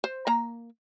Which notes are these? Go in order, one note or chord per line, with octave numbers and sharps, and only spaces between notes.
C5
A#3 A#5